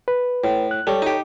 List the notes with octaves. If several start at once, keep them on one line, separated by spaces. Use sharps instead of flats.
B4
A2
F#6
G3 A4 C#5
D#4 G4